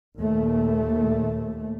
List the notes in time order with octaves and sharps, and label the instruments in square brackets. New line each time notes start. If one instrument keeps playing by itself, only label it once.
[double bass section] D#2 A#2 A3